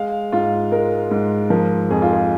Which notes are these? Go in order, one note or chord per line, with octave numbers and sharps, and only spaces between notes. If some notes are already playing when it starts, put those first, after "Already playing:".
Already playing: G#3 F5
G#2 F4
G#3 A#4
G#2
F3 A#4
F2 G#4
F4
G#4